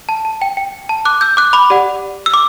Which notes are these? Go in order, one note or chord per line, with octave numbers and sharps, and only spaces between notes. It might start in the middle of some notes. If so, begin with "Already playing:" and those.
A5
A5
G5
G5
A5
D6 F#6
E6 G6
D6 F#6
B5 D6
G4 D5 F#5
E6
D6